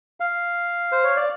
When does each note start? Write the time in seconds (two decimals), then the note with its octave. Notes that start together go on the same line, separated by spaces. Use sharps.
0.20 F5
0.92 C5
1.04 C#5
1.17 D5